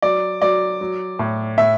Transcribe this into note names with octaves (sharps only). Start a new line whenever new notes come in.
F#3 D5
F#3 D5
F#3
A2
A2 E5